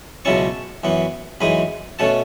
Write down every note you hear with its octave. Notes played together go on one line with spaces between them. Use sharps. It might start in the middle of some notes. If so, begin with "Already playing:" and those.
C#2 B2 F#3 C#4 E4 A5 C#6
F#2 E3 B3
F#2 E3 G#3 D#4 G#5 B5
B2 A3 C#4 F#5 A5